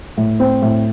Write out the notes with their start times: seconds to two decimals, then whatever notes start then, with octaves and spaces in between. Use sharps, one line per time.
0.17 A2
0.40 C4
0.62 A2